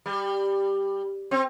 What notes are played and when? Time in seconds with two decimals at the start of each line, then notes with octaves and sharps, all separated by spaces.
0.06 G3
1.31 C4